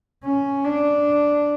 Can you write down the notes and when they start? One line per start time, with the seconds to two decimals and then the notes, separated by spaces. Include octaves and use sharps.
0.24 C#4
0.64 D4